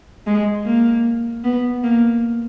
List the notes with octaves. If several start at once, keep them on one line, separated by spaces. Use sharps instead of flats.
G#3
A#3
B3
A#3